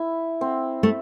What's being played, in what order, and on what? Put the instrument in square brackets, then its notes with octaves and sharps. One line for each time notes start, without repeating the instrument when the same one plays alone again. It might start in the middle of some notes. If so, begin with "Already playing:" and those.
Already playing: [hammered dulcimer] E4
C4
[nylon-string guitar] A3